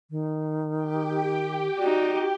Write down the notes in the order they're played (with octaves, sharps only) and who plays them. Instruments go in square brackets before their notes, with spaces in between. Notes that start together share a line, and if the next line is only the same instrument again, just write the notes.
[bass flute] D#3
[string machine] G4 G5
[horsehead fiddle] D#4 F#4 [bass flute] D5